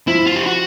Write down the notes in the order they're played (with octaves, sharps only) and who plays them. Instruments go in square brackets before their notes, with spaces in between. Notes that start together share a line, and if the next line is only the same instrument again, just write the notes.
[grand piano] F3 [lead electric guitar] E4
[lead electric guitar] F4
G4
F#4